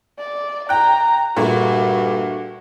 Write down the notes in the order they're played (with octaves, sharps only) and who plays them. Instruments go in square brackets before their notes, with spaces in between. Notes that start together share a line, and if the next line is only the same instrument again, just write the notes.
[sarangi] D5
[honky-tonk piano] G5 F#6 [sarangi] A#5
[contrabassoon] G2 [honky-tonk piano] A#2 A3 [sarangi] F#4